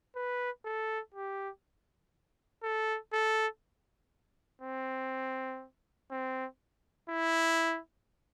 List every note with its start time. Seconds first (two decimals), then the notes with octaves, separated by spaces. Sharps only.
0.16 B4
0.65 A4
1.15 G4
2.63 A4
3.13 A4
4.62 C4
6.11 C4
7.09 E4